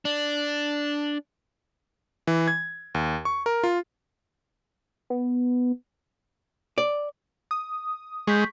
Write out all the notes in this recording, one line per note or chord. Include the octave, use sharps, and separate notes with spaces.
D4
E3
G#6
D#2
C#6
A#4
F4
B3
D5
D#6
G#3 C#6 G6 B6